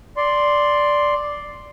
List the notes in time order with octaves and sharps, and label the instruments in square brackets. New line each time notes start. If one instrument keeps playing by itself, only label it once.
[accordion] D5 C6